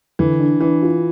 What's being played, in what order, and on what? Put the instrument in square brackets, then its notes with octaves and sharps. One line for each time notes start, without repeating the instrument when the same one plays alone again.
[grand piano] D3 [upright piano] E3
[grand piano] D4
[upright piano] E3 [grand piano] D4
[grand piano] F4